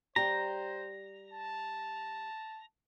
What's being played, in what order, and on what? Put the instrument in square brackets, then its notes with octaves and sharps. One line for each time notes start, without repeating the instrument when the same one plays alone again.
[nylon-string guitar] G3 G4 [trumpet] C5 [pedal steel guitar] A#5
[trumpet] A5